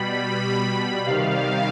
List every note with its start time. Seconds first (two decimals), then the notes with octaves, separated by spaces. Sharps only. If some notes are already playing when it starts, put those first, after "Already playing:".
Already playing: B2 G3 B5
1.06 C3 D#3 G3 F5